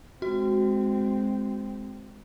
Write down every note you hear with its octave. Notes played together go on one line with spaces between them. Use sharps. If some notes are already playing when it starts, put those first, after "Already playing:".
G#3 C4 F#4